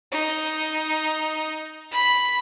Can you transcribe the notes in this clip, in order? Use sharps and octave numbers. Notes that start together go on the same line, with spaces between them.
D#4
B5